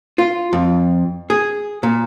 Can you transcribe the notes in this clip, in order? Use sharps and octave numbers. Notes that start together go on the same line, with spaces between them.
F4
F2
G#4
A#2